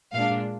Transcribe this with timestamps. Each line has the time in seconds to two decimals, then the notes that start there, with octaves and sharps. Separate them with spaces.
0.13 A#2 G#3 D4 F5